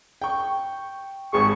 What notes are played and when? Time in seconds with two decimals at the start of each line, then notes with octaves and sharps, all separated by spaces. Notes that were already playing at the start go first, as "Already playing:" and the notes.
0.22 G5 C#6
1.33 G#1 G#4 C#6